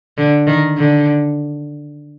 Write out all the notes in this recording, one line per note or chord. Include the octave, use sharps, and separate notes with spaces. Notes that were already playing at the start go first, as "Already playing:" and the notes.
D3
D#3
D3